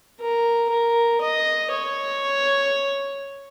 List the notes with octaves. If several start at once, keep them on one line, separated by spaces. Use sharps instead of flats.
A#4
A#4
D#5
C#5